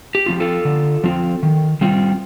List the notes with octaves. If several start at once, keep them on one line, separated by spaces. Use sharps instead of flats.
G4
F3 C4 F4
F4 A4
D3
F3 C4 F4
D#3
G3 C4 F4